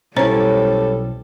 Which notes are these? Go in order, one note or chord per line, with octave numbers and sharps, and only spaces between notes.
B1 G3 C#4 E4 A4 C5 C#5 A#5